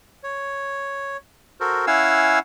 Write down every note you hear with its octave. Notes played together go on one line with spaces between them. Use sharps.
C#5
F#4 A4 A#4 C5
C#4 E4 F5 F#5 G#5 E6